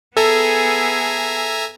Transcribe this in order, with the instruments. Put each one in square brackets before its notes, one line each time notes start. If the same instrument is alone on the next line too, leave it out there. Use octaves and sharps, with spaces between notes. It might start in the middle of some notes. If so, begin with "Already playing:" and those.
[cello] B3 G#4 [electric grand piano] A4 [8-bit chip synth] E5 G#5 A#5